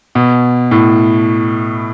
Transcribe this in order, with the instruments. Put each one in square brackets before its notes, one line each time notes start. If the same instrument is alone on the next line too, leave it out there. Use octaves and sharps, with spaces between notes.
[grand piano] B2
A2